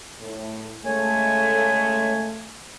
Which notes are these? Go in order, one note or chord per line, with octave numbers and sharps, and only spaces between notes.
A2
C#3 G#3 A3 C#5 G#5